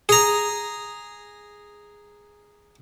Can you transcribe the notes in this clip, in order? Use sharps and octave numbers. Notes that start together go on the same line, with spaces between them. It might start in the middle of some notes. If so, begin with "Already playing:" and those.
G#4 A#5